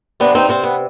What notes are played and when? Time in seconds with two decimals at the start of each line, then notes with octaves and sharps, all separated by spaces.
0.20 C3 B3 D4
0.35 C4 D#4
0.49 C3 C4
0.64 B3